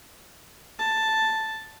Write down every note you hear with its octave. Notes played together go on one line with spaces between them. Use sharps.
A5